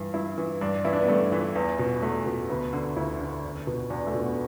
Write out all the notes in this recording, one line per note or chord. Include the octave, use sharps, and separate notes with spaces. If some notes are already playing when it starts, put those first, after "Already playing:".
Already playing: G2 E3
G2 E4
E3
G2 D4
E3 E4
D4
B3
G2 A3
E3
E2
B2
E2 A3
B2
D2 B3
D3
D2 E4
D3
E2
B2
E2 D4
A3
B2
B3